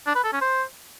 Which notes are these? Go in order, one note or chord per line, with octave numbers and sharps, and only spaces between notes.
D4
B4
A4
C#4
C5